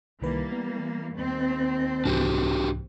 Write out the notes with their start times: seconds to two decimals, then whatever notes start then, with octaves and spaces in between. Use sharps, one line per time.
0.21 C2 D#3 E3 G3 A#3 B4
0.52 B3
1.14 D#2 C4
2.05 C2 G#2 E3 D4 F#4 G4